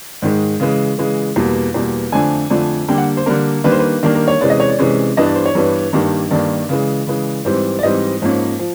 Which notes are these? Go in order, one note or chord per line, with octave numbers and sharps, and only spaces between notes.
G#2 D#3 G#3
C#3 E3 G#3
C#3 E3 G#3
E2 B2 G3 A#3
E2 B2 G3 A#3
F2 D3 F3 A3 D4 G#5
F2 D3 F3 A3 D4
D3 G3 A#3 D4 G5
F#5
C5
D3 G3 A#3 D4 A#4
D#3 G3 A#3 D4 B4
C5
B4
D#3 G3 A#3 D4 A#4
A#4
C#5
C3 E3 G#3 C#4 D5
D#5
C#5
D5
C3 E3 G#3 C#4
G2 E3 G3 B3 D4 D#5
D5
C5
C#5
G2 E3 G3 B3 D4
G2 D#3 G3 A#3 D4
G2 D#3 G3 A#3 D4 D5
C#3 E3 G#3
C#3 E3 G#3
G#2 E3 G3 C4
D5
G#2 E3 G3 C4 D#5
G#2 F3 A#3 C#4
F3